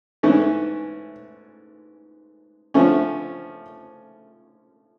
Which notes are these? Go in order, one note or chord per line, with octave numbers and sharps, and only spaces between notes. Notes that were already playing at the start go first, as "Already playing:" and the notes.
G#2 E3 A3 C#4
D3 F3 A3 C#4